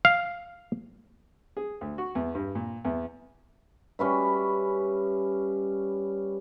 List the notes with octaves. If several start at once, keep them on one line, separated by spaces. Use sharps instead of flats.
F5
G#4
D2
F#4
E2
G2
A#2
E2
G3 C#4 B4 E5